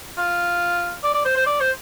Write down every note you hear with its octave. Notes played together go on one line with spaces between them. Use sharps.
F4
D5
D5
C5
C5
D5
C5